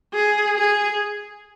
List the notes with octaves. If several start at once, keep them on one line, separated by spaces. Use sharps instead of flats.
G#4
G#4